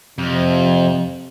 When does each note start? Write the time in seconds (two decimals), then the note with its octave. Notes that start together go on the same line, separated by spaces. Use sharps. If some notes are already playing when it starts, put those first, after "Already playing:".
0.18 F2 C3